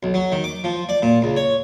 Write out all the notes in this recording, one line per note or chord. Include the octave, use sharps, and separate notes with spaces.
B1
F#3
D#3
D6
F3
D5
A#2
C#2
C#5